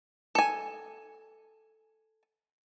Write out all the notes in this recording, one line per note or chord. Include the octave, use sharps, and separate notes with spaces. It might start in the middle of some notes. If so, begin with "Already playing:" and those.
A4 G#5